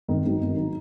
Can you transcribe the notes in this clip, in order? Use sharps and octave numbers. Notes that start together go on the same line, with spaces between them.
G#1 D#3 D#4
G#2 D#3 F#3
G#1
D#3 F#3